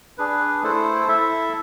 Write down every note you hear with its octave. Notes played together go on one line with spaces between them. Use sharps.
D4 G#4 B4
A3 E4 A4 C5
E4 A4 E5